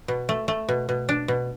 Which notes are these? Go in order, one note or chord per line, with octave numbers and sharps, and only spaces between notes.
B2
A3
A3
B2
B2
D4
B2